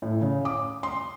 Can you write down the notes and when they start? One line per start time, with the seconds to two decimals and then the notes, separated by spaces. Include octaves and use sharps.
0.02 A2
0.21 C#3
0.45 D6
0.83 C6